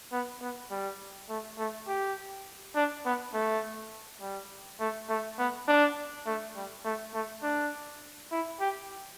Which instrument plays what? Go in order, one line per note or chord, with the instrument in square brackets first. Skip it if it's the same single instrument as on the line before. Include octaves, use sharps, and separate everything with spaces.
[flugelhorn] B3
B3
G3
A3
A3
G4
D4
B3
A3
G3
A3
A3
B3
D4
A3
G3
A3
A3
D4
E4
G4